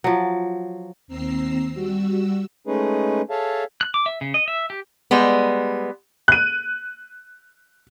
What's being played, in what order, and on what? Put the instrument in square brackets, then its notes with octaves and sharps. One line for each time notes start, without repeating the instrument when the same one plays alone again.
[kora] F3 F#3
[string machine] D#2 C4 A#5 E6 C7
G3 F#4 E6
[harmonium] G#3 A3 C#4 D#4 G#4 B4
G#4 A4 C#5 E5 F5 A5
[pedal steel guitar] F#6
D6
E5
C#3
D#5
E5
G4
[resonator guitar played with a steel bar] G3 G#3 B3
[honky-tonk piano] F#6 D#7